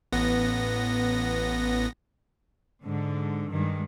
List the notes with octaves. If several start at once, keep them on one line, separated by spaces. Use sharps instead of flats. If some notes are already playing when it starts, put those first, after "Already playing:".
A1 B3 A#6
G#2 D3
G2 D#3 G#3